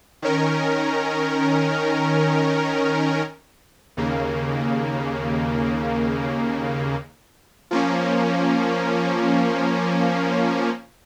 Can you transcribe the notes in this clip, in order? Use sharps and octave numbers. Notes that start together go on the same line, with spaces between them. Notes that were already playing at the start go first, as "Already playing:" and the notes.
D#3 C#4 A#4
D#2 C#3 A#3
F3 A#3 C#4